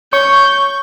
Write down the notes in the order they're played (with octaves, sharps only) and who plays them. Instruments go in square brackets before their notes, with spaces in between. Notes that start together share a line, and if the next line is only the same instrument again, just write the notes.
[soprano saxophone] C#5 [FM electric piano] C#6 [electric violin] G6